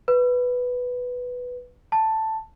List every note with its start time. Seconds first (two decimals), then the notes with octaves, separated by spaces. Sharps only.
0.08 B4
1.92 A5